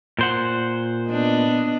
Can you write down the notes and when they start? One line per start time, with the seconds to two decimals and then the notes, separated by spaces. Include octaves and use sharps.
0.19 A#2 C5 F#5
1.10 B3 D4 D#5